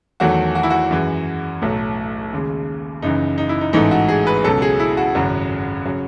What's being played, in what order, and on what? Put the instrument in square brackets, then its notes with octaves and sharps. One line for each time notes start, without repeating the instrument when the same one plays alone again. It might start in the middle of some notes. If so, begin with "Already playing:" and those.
[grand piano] E2 D#3 F#3 A3 F#4
F#4
E4
F#4
F#2 E3 G#3
B1 A2 F#3 A3
D#2 C#3 G#3
F#1 F#2 C#3 E3 D#4
D#4
E4
D#4
A1 G#2 E3 A3 D#4
F#4
G#4
B4
C#2 B2 F#3 A4
G#4
E4
F#4
G#1 F#2 C#3 F#3
C#3 F#3